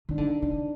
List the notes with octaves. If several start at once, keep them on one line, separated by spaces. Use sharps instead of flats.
D#3 D4
D3 D#4
D3 D4